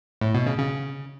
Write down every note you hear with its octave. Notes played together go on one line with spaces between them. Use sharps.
A2
B2
C#3
C#3